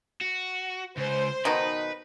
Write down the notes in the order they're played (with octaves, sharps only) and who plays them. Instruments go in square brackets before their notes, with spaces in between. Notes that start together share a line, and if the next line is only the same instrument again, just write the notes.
[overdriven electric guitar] F#4
[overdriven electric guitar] C#2 [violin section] C5
[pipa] B2 D#3 D#4 [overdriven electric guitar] B4